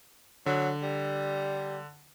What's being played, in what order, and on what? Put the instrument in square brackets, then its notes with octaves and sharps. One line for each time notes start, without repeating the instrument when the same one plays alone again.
[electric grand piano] D3 [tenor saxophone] F#3
[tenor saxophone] G3